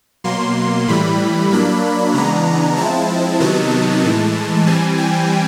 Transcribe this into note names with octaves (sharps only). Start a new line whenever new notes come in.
B2 F#3 A#3 C6
A2 E3 G3 B5
F#3 A#3 D4
C#3 E3 G#3 B3 D4 A#5
F3 G#3 C4 E4 A5
C3 D#3 F#3 B3 D#4
A2 E3 G#3
E3 G3 C4 G#5
G5